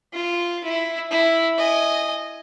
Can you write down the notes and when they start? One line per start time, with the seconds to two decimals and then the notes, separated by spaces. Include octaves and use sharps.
0.13 F4
0.64 E4
1.11 E4
1.57 D#5 G#5